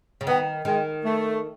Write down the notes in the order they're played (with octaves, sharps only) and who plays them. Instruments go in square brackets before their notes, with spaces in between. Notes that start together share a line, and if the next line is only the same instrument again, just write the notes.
[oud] C#3
[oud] D#3 [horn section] B3
[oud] D#3 [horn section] G#3
[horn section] A3